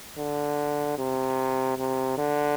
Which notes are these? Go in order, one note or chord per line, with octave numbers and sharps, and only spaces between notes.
D3
C3
C3
D3